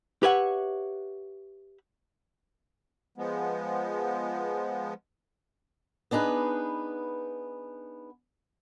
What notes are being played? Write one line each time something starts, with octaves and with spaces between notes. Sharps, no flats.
G4 B4 C#5 E5 F#5
F3 G#3 B3
B3 D4 D#4 G#4 B4